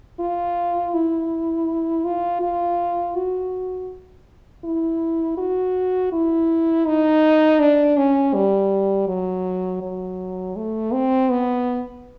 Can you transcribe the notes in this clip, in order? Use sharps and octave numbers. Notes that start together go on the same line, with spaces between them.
F4
E4
F4
F4
F#4
E4
F#4
E4
D#4
D4
C#4
G3
F#3
F#3
A3
C4
B3